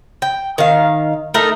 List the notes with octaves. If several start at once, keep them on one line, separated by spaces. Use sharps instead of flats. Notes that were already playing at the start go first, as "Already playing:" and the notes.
G5
D#3 F5
A3 D#4 A#4